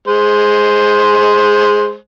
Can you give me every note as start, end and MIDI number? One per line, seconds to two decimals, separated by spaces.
0.07 1.96 56
0.07 1.96 72